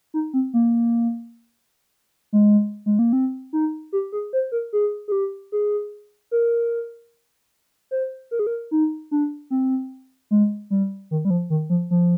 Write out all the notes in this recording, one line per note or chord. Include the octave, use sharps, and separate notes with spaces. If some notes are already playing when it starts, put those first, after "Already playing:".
D#4
C4
A#3
G#3
G#3
A#3
C4
D#4
G4
G#4
C5
A#4
G#4
G#4
G4
G#4
A#4
C5
A#4
G#4
A#4
D#4
D4
C4
G#3
G3
D#3
G3
F3
D#3
F3
F3